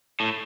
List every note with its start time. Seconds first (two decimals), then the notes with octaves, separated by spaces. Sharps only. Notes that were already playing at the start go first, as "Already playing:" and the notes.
0.20 A2